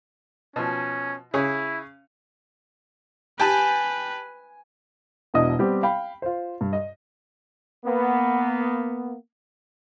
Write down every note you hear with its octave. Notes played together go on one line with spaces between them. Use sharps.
B2 F3 C#4
C#3 E4 G#4 C#5
G4 B4 G#5 A5
E1 B2 D4 E4 D#5 D#6
G3 B3 C4 G4
F5 G5 B5
F4 C5
G2
D#5
A#3 B3